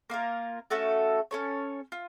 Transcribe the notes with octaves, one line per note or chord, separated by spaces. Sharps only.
A#3 F4 A#4
A3 C#4 F#4 A4
C#4 A4 C#5
F4